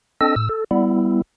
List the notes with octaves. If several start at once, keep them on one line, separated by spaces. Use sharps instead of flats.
C4 D4 A4 D#5 E6
A2 E6
A4
G3 B3 E4